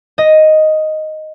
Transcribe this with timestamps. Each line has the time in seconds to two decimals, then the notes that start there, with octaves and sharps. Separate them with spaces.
0.18 D#5